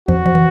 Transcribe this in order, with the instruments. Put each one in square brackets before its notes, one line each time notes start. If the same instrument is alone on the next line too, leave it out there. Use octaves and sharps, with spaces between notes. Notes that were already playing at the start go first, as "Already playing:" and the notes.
[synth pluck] F2 F3 [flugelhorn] F#4
[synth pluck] F3
E3